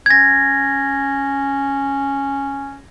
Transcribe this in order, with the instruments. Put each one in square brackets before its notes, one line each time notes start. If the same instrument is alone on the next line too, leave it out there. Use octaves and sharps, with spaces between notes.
[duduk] C#4 [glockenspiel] G#6 A#6